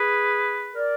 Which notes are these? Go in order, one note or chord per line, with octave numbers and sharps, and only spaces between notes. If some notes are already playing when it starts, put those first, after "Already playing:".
Already playing: G#4 B4
A#4 D5